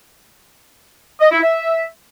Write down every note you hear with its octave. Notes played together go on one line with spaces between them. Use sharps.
D#5
E4
E5